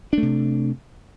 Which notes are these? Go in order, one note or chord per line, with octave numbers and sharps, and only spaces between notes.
C3 A3 D4